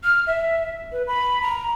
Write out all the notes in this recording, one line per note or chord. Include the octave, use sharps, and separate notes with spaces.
F6
E5
B4
B5
A#5